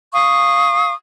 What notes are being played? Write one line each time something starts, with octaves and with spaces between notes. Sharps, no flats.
F5 C#6 D#6